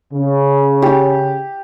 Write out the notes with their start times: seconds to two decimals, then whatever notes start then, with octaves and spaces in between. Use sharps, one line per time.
0.12 C#3
0.82 G4